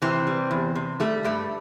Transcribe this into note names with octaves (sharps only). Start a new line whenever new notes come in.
C3 E3 C4
G3
E2
C3
G3 A3
G2 A3